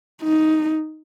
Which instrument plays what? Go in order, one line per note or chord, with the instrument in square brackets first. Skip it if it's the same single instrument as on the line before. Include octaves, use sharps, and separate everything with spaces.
[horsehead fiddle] D#4